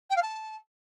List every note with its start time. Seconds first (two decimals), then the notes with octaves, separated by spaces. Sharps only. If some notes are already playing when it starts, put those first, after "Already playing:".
0.10 G5
0.16 F5
0.22 A5